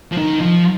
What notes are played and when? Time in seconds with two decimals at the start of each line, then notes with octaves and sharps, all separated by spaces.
0.12 F3
0.17 D#3
0.41 F3